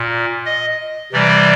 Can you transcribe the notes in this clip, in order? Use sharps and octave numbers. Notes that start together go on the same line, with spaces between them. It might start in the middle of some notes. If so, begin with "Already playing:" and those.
Already playing: A#2
D#5
C3 E3 G3 D5